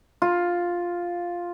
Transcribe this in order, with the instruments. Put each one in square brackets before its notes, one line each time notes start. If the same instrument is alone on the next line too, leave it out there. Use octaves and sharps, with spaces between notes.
[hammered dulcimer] F4